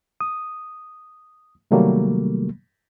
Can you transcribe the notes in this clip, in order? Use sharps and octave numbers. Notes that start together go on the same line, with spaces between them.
D#6
C3 D#3 F#3 G3 A3 A#3